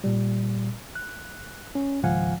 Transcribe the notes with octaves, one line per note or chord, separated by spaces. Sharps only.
A#2 G3
F#6
C#4
G#1 C#2 F3 F5 F#5 G#5